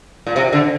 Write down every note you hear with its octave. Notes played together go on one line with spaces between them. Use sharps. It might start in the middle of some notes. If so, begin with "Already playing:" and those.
A#2
C3
D3